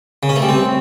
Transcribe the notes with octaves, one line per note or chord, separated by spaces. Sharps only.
C#3
C#4
A3
G3
C4